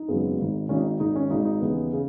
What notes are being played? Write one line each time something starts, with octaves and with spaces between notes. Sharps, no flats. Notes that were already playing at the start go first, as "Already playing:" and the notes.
Already playing: D#4
G#1 F#2 C#3 G#3 B3
G#1 G#2 D#3
G#1 G#2 D#3 C#4
D#4
G#1 G#2 D#3 D#4
C#4
G#1 G#2 D#3 D#4
D#4
D#2 C#3 E3 B3
C#3